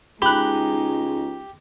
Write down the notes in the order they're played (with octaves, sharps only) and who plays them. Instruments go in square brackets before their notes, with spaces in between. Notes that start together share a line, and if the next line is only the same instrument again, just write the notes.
[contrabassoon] C#2 [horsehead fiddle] G#3 D#4 [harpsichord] G4 [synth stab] B5 F#6